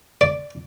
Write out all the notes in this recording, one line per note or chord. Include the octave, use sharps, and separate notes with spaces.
D5